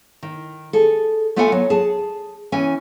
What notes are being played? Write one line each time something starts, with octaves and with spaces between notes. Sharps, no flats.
D#3
G#4 A4
A3 B3 F4 A4 F#5 G#5
F#3
G#4 A5
E3 C#4 G#5